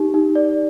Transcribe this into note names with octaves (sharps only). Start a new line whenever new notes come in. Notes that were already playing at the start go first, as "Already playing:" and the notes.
Already playing: D#4 G4
D#4
D5